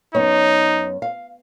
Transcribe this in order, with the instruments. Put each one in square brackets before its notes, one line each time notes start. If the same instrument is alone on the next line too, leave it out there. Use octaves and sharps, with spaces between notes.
[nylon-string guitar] F#2 B3 C#5 [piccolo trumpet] D#4
[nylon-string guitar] F5